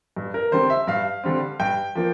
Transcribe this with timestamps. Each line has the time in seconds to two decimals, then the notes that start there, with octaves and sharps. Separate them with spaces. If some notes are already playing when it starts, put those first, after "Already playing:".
0.16 G2
0.34 A#4
0.52 D3 G3 C4 C5
0.70 E5
0.87 G2 F5
1.24 D3 G3 C4
1.60 G2 G5
1.95 F3 A#3